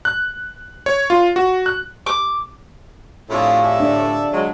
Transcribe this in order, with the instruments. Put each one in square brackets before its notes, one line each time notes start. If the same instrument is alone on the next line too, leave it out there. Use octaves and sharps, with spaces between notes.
[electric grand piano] F#6
C#5
F4
F#4
F#6
[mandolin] D6
[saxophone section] A2 [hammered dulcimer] C3 F3 G#4 [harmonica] D4 E4 F4
[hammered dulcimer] E3 [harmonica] A4 D5 E5
[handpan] D4
[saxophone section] F#3 G#3